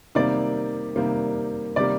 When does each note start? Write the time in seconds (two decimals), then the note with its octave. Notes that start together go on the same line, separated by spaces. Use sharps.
0.15 C3 D#3 G3 A#3 D5 D6
0.96 C3 D#3 G3 A#3
1.76 C3 D#3 G3 A#3 D5 D6